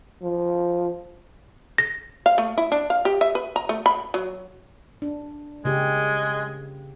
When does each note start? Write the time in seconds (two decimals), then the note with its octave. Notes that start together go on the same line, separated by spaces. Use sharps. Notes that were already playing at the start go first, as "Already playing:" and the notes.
0.22 F3
1.78 A#6
2.26 F5
2.38 A3
2.58 E4
2.72 D4
2.90 F5
3.05 G4
3.21 E5
3.35 B4
3.56 A#5
3.69 A3
3.86 B5
4.14 F#3
5.02 D4
5.65 C#3 G#3 A#3 G4